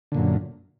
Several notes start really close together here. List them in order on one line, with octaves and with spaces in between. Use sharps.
D3 A#2 F#2